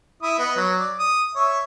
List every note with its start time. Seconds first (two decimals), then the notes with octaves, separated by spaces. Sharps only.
0.22 E4 D#6
0.39 B3 D#5
0.57 F#3
0.79 D5
0.99 D#6
1.35 C#5 E5